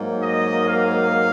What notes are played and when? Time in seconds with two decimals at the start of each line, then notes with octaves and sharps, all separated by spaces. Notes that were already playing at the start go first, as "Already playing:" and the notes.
Already playing: G#2 F#3 A#3
0.22 D#5
0.66 F5